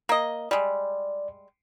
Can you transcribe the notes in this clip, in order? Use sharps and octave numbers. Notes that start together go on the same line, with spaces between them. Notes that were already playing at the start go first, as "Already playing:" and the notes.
A#3 D#5
G3 G#3 D5